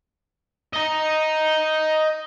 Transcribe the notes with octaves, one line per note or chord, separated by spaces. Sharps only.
D#5 A#5